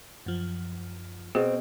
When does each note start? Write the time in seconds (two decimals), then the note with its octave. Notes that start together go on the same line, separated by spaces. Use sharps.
0.26 F#2 F3
1.35 B2 C4 G#4